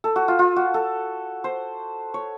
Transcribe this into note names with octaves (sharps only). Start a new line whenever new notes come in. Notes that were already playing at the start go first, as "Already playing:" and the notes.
A4
F#4
F4
F4
F#4
A4
C5
C#5